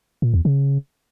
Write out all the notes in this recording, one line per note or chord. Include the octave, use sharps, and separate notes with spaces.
A#2
E2
C#3